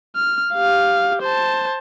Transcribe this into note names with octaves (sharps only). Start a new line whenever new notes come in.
F6
G4 F5
C5 A5